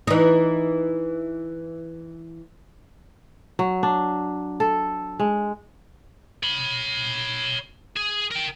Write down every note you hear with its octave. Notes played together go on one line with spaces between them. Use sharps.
E3 D#4
F#3
D4
A4
G#3
C#5 B5
G#4
A#4 G5